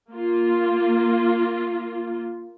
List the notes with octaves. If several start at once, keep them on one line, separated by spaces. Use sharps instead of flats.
A#3 F4